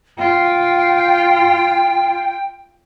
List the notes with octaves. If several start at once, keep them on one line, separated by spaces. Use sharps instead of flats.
F4 G5